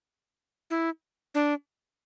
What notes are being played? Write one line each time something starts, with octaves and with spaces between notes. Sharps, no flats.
E4
D4